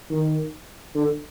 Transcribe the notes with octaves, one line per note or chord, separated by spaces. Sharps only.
D#3
D3